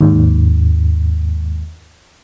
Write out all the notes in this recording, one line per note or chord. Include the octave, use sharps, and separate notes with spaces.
D#2 G#2